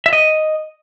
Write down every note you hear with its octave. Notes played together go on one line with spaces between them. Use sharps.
E5
D#5